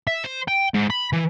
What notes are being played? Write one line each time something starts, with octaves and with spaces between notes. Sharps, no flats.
E5
C5
G5
G#2
B5
E3